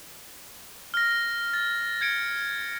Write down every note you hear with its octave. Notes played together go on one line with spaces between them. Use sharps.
F6 A#6
A6
G#6 C#7 D7